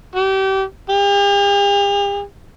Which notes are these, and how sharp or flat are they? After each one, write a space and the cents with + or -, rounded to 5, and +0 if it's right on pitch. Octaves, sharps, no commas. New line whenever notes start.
G4 -30
G4 +45